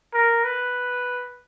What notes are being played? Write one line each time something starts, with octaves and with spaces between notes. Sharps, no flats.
A#4
B4